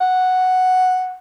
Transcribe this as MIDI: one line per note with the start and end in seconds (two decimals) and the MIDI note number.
0.01 1.18 78